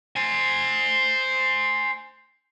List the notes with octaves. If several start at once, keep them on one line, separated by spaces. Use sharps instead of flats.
C5 G#5